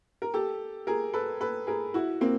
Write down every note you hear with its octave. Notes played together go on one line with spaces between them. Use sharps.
A#4
G4 A4
G#4 A#4
A4 B4
A4 B4
G#4 A#4
E4 F#4
A#3 C4